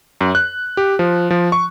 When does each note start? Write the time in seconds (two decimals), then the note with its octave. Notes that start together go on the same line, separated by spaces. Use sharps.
0.21 F#2
0.35 F#6
0.77 G4
0.99 F3
1.30 F3
1.52 C#6